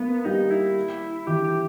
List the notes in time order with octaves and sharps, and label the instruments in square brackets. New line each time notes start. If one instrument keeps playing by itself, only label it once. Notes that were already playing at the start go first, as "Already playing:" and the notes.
Already playing: [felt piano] A#3 [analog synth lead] B3
[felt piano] G3 [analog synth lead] D#4
[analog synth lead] E4
[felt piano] E3 [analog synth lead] G4
[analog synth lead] G4